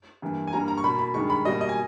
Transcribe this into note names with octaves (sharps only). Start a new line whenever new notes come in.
G2 E3 A#3
G#5
G2 G3 A#3 A#5
A#5
C#6
B2 A#3 B5
B5
G2 D#3 G#3 C#6
B5
B2 G3 A#3 D#5
D#5
G#5